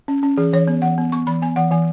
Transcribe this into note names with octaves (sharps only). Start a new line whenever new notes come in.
C#4
C#4
E3 G#4
E3 C#5
B3
E3 F#5
B3
B3 C#6
E3 B5
B3 G#5
E3 F#5
E3 G#5